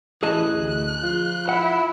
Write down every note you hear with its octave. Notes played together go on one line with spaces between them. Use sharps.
A1 E3 G#4 D#5 A5 F#6
D2
F3 F4
E4 F#5